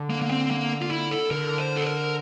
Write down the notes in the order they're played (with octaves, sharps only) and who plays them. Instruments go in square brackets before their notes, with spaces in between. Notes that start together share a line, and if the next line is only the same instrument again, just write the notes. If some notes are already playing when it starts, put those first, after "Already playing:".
Already playing: [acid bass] D3
[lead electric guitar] A#3
A#3
C4
A#3
F4
E4
A4
[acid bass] D3 [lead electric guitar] A#4
[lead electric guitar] C5
A4
A#4